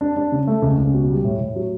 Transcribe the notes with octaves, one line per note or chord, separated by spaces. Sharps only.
D4
D4
C#3
A3
C#2
C#2
B2
G3
A2
A2
F#3